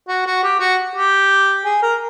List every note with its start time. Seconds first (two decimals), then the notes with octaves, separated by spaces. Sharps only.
0.08 F#4
0.26 F#4
0.43 G4
0.60 F#4
0.96 G4
1.65 G#4
1.82 A#4